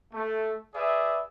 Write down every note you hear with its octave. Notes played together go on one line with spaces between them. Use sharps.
A3
G#4 B4 D5 E5